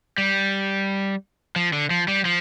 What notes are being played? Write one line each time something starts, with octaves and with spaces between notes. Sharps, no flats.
G3
F3
D3
F3
G3
F3